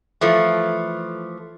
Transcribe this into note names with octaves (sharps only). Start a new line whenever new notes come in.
E3 F3 A3